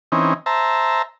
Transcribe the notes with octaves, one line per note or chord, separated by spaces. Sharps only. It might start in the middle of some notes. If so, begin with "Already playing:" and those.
E3 C4 C#4 D#4
C5 E5 A5 A#5